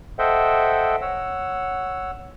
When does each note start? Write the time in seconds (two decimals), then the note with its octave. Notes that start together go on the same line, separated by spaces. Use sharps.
0.19 A4 C5 D#5 E5 F#5 G5
1.01 C#5 F#5 E6